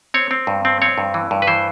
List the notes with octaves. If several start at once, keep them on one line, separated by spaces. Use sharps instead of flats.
C4 C#5
C4
G2
C4
C4 C#5
G2
E3
G2
B4
E3 C5